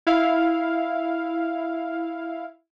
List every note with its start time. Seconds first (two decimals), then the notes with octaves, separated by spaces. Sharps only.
0.07 E4 F5